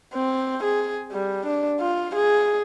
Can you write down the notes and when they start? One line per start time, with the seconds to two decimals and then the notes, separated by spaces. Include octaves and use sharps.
0.14 C4
0.64 G#4
1.12 G3
1.46 D4
1.80 F4
2.15 G#4